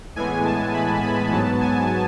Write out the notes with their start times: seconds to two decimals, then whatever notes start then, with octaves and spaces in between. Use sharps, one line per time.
0.16 A2 E3 G#3 B3 G#5
0.45 A5
0.74 B5
1.03 B5
1.32 G#2 F#3 B3 A5
1.61 G#5